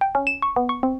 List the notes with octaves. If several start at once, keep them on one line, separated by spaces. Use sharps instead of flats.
G5
C#4
E7
C#6
B3
C#6
C4